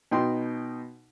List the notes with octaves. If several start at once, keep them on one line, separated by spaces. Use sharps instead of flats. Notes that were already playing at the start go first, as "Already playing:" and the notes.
B2 D#4 G5 C6